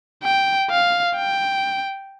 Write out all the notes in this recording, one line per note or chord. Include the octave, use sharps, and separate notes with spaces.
G5
F5
G5